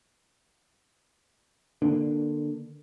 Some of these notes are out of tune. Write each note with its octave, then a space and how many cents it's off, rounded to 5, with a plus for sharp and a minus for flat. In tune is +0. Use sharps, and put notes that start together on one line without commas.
D3 +15 A#3 +15 D4 +0